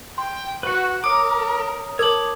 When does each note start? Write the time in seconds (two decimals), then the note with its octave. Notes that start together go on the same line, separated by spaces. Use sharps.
0.18 G5 C6
0.63 F#4 B4 F#5
1.04 A#4 C#5 D6 D#6
1.99 A#4 C#5 A5 D6 D#6 F#7